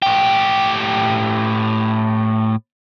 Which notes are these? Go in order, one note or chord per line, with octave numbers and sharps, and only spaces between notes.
A2 G4